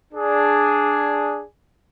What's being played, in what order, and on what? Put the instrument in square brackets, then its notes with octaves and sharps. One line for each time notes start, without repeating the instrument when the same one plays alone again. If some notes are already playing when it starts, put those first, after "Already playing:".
[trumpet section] D4 G#4